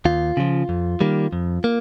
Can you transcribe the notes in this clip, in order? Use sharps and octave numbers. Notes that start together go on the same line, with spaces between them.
D#2 F4
C#3 F3
F2
D#3 G3 A#3
F2
A#3